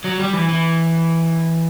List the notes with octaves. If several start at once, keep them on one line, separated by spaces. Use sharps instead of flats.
F#3
G3
E3
E3